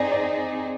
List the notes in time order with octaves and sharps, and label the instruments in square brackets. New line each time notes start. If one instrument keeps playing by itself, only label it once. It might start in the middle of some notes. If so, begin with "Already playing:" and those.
Already playing: [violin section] C4 D#4 G#4 [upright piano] D5
[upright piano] D5